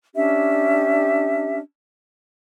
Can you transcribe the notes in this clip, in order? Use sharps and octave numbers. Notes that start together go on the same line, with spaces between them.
C#4 D4 G4 E5